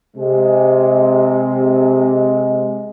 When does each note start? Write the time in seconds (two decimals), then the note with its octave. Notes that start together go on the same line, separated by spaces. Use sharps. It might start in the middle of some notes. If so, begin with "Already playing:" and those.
0.16 C3 G#3